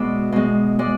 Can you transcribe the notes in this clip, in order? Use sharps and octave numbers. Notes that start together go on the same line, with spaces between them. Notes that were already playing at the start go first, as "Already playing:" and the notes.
Already playing: B2 G#3 D5 E5
B2 G#3
G#3 D5